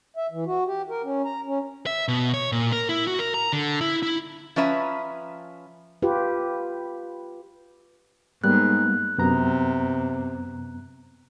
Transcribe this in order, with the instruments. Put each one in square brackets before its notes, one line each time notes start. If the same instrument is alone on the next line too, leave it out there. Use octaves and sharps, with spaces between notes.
[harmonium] E5
E3
F#4
G4
A#4
C#4
A#5
C#4
[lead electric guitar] E5
B2
C#5
A#2
A#4
E4
F#4
A#4
A#5
D3
E4
E4
[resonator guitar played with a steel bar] F3 C#4 B4 E5 A#5
[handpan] F4 G4 B4
[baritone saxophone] G#2 [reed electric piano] G3 A#3 B3 [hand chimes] F#6
[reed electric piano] F#2 B3 A#5 [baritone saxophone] C3